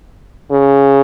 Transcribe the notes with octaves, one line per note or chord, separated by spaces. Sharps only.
C#3